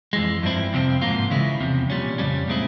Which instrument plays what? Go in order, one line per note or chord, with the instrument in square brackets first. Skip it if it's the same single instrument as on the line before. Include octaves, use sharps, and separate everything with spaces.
[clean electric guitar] F2 E3 G#3
G2 F3 C4 E4
F2 C3 F3 C4
G#2 F3 A#3 F4
C#3 E3 G#3 E4
E2 C3 F3
A#2 G3 C#4
F2 C#3 G3 C#4
A#2 G#3 C4 E4